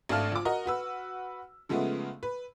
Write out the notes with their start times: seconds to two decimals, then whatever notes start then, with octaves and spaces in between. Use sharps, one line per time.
0.09 G#1 A3 D4 F5 A5 F6
0.32 F3 D6
0.45 F#4 A#4 D#5
0.66 F#4 B4 E6
1.69 C#3 F3 G#3 A3 B3
2.23 B4